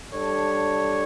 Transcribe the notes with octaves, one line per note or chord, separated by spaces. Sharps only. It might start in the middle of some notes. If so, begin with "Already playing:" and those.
G3 D4 A4 C#5